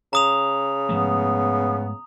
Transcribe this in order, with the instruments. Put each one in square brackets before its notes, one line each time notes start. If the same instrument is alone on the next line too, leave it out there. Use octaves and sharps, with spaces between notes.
[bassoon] C#3 [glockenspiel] A#5 D#6 F7
[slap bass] G#2 F3 A3 [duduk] B3